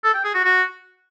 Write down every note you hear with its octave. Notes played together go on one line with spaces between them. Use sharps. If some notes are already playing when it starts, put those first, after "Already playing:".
A4
G5
G#4
F#4
F#4